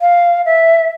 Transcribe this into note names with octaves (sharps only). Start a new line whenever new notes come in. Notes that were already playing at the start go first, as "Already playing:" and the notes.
F5
E5